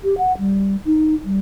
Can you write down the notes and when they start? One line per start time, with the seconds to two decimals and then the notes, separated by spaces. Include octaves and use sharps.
0.04 G4
0.18 F#5
0.38 G3
0.85 D#4
1.25 G3